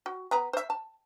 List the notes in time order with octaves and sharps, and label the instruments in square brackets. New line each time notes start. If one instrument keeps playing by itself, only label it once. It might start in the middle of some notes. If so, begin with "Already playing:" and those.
[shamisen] F#4
B3 B4 A#5
C5 E5
A5